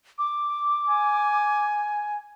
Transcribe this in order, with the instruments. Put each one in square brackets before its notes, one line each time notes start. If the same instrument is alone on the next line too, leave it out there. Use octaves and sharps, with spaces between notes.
[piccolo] D6
[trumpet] G#5